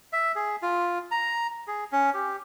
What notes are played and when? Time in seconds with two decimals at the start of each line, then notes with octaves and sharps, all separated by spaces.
0.13 E5
0.35 G#4
0.62 F4
1.11 A#5
1.67 G#4
1.92 C#4
2.14 G4